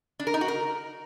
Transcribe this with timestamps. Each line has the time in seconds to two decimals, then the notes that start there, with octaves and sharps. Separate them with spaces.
0.20 D4
0.27 A#4
0.34 D#4
0.41 F#4
0.48 A#4